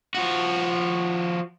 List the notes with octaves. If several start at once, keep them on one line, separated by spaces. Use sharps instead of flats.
F3 F#4